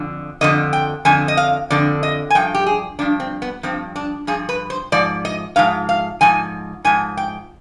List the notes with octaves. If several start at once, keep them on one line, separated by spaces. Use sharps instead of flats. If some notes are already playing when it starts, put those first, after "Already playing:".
Already playing: F2 D3 F3
F2 D3 F3 D#5
G5
F2 D3 F3 G#5
D#5
F5
F2 D3 F3 D5
D#5
G#5
G2 F3 G5
G4
G#4
G2 F3 D4
C4
B3
G2 F3 C4
D4
G2 F3 G#4
B4
C5
G#2 F3 D5
D#5
G#2 F3 F5
F5
G#2 F3 G#5
G#2 F3 G#5
G5